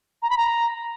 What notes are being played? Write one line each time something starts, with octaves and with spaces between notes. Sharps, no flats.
A#5
B5
A#5